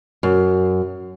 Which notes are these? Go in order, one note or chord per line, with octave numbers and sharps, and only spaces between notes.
F#2